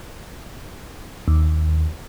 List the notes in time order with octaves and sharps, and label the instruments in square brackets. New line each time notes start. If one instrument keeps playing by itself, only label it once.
[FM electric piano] D#2